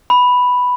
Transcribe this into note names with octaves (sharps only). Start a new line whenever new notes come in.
B5